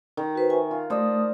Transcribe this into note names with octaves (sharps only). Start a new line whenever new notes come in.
D#3
F#4 B4 C5
E5 G#5 C#6
F4
A3 C5 D5 D#5 D#6